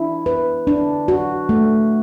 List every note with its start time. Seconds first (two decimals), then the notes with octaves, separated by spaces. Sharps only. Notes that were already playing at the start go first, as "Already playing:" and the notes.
Already playing: D4 E4
0.26 B4
0.67 D4
1.08 F#4
1.49 A3